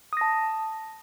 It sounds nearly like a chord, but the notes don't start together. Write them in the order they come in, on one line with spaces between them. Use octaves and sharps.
D#6 A#6 A5